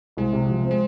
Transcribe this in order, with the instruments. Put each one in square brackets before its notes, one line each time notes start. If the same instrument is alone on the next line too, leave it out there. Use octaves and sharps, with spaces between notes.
[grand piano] C2 [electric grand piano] G#3
[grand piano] C3
F3
C4
[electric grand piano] G#3